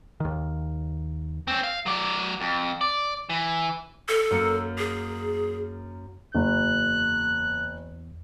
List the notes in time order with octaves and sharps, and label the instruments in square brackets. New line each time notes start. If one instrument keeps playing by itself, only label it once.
[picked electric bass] D#2 D#3
[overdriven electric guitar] C4 C#4
F5
F#3 D5
F2
D5
E3
[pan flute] A4
[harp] F#2 A#3 C#7
[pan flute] G#4
[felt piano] F#1 [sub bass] E2 [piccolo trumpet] F#6